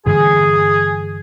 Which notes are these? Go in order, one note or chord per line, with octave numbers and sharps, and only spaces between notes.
G2 D3 E3 G#4